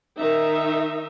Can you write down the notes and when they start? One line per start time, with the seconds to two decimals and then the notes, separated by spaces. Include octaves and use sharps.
0.19 D#3 D#4 E5